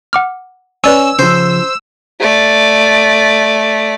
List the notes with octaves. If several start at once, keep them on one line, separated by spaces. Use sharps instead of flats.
F#5 D6 F6
C#4 B4 D5 G#5 E6
C#3 F3 C5
A3 D5